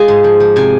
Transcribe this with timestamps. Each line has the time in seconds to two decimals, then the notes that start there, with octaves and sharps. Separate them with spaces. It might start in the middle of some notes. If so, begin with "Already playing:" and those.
Already playing: G#3 F4 G#4 G#5
0.08 G#2
0.24 F3
0.40 F3
0.56 C3 G#5